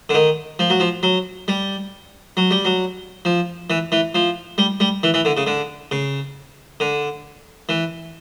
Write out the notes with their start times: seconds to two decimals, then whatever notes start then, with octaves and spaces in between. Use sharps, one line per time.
0.09 D3
0.14 D#3
0.59 F3
0.70 F#3
0.80 F3
1.03 F#3
1.48 G3
2.37 F#3
2.51 G3
2.65 F#3
3.25 F3
3.70 E3
3.92 E3
4.15 F3
4.58 G3
4.80 G3
5.03 E3
5.14 E3
5.25 D3
5.37 C#3
5.47 D3
5.91 C#3
6.80 D3
7.69 E3